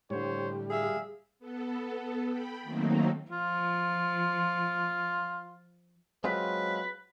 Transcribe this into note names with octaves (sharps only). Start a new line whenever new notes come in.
A2 D3 G3 C5 C#5
G#4 E5 F5
B3 A4
G5 B5
D#3 F#3 A3 A#3 C4 D#4
F3 F4
F#3 G#3 C4 F4 B4